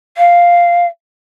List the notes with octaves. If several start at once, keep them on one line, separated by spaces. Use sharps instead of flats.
F5